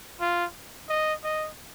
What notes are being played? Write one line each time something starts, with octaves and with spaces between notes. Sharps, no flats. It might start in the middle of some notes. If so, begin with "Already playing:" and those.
F4
D#5
D#5